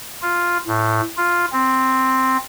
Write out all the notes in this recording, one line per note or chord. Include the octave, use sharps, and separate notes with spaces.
F4
A2
F4
C4